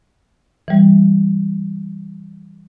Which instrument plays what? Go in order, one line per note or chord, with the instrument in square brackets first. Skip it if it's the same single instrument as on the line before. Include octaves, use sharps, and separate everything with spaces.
[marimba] E3 G3